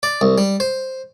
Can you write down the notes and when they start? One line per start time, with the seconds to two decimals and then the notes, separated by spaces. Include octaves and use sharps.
0.03 D5
0.21 C2
0.38 G3
0.60 C5